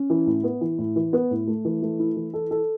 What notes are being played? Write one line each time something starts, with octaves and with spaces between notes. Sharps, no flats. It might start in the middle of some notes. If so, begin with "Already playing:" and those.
Already playing: C#4
E3
A2
B3
E3
A2
E3
B3
A2
A3
E3
A3
E4
E3
A4
A4